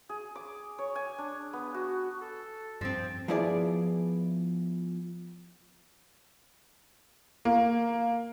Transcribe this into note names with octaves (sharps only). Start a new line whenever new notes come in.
G#4
D6
C#5
G#5
D4
B3
F#4
A4
G2 F3 C4 A6
F3 B3 E4 G#4 D5
A#3